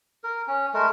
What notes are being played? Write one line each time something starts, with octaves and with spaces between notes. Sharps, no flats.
A#4
C#4
G#3 A3 A#4